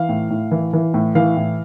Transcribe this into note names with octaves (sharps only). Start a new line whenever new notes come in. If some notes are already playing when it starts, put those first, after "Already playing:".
Already playing: E3 F5
A2
A2
E3
E3
A2
E3 F5
A2